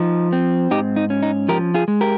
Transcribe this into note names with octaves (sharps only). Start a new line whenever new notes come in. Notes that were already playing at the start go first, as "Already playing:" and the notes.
Already playing: F3 D#4
C4
G#2 D#4 G4
D#4
C#4
D#4
F3 G4 A#4
F4 G#4
G#3
G4 A#4